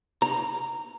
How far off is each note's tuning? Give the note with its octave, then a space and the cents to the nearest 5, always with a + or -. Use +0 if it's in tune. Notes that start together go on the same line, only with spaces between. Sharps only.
A#5 -15